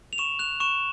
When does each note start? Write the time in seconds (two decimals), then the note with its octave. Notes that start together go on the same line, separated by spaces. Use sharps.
0.13 F7
0.18 C#6 E7
0.39 F#6 F7
0.60 C#6 E7